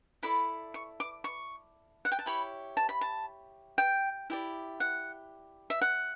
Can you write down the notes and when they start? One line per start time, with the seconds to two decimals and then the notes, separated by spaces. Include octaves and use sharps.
0.23 E4 A4 D5 B5
0.74 C#6
1.00 D6
1.24 C#6
2.05 F#5
2.12 G5
2.19 A5
2.26 E4 G4 C#5 B5
2.77 A5
2.89 B5
3.01 A5
3.78 G5
4.30 E4 G4 D5
4.80 F#5
5.70 E5
5.82 F#5